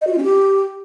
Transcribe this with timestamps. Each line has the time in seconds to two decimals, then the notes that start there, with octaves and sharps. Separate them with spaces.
0.01 D#5
0.07 F#4
0.13 F4
0.18 C#4
0.24 G4